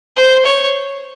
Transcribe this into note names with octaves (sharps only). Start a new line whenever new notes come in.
C5
C#5